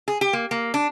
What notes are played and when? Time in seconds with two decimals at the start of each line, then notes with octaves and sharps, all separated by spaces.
0.08 G#4
0.21 G4
0.33 A#3
0.51 A#3
0.74 D4